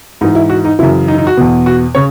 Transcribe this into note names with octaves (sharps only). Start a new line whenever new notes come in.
G#2 E3 D#4
E4
F#4
D#4
F#2 C#3 E3 E4
D#4
D#4
F#4
E2 B2
F#4
C#3 C#5